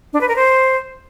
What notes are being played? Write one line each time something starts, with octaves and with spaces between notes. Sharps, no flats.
D4
B4
A#4
C5